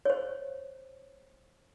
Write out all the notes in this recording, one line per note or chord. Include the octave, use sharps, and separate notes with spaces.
C5 C#5